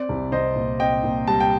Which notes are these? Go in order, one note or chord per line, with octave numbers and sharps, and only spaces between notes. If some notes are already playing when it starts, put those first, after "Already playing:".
Already playing: C4 D5
C2
C2 C5 D#5
A#2
C4 D#5 G5
A#2
G3 A5
G5